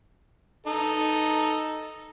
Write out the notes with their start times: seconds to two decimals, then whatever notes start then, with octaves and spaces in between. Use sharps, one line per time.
0.66 D#4 A4